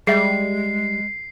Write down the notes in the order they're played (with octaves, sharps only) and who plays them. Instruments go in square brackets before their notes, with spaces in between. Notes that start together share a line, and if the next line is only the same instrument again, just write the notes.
[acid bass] G3 [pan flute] G#3 [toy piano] G#4 E5 [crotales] C7